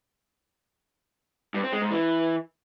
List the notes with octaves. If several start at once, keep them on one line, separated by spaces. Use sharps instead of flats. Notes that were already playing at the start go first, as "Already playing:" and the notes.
G2
C4
G#3
G#2
E3